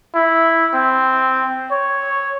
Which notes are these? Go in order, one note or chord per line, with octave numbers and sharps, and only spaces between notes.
E4
C4
C#5